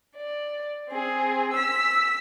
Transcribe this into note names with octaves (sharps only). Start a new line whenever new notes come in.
D5
C4 G#4
E6 B6